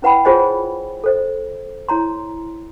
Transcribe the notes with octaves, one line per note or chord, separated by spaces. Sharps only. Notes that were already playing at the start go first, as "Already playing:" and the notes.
C#4 E4 B4 F#5 G5 B5
F4 G#4 C5 C#5 D#5 G#5
A4 C5 D#5
E4 C#5 A#5 C6